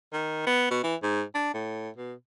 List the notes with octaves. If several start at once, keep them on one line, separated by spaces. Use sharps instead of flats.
D#3
B3
B2
E3
G#2
D4
A2
B2